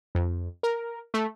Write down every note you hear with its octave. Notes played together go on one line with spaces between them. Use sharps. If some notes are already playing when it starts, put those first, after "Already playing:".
F2
A#4
A3